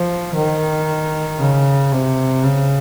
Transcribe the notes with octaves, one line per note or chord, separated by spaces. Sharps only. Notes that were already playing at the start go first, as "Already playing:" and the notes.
Already playing: F3
D#3
C#3
C3
C#3